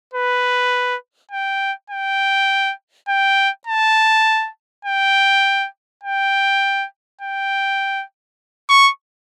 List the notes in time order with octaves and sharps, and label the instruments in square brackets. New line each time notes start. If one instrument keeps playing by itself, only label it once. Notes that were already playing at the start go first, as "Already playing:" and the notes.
[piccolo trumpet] B4
G5
G5
G5
A5
G5
G5
G5
C#6